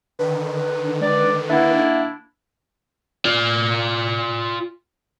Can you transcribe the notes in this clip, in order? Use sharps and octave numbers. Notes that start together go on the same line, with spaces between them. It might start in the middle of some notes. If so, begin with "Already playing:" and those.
D3 D#3 B4
G#3 D5
A#3 D4 E4 E5 F#5
F4 D5